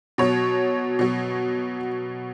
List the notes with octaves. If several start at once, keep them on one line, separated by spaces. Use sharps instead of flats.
B2 F#3 C#5
B2 F#3